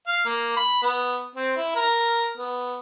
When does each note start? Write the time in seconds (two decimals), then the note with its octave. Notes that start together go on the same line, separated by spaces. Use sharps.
0.07 F5
0.26 A#3
0.57 B5
0.83 B3
1.36 C4
1.57 E4
1.75 A#4
2.37 B3